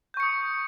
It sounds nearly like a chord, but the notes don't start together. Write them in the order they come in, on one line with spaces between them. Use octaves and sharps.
G6 C#6 C#7 D#6